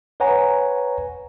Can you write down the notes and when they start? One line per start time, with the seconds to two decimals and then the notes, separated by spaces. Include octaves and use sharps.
0.20 B4 C#5 F#5 G#5 A#5